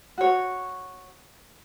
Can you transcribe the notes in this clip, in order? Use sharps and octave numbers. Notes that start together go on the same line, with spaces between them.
F#4 C#5